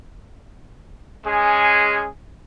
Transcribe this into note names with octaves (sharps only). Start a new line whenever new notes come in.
G#3 C#4 G#4